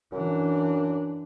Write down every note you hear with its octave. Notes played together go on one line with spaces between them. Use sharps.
F#2 E3 D4